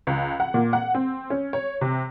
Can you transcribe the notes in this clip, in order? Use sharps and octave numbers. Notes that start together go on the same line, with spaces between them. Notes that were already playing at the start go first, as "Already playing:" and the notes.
C#2
F#5
A#2
F#5
C4
C#4
C#5
C3